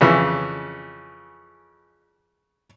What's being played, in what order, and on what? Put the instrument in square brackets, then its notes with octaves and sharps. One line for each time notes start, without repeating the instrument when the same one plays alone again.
[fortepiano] F2 C#3 E3